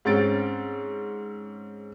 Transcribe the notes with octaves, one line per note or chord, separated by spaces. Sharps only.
G#2 C4 C#4 A6 D7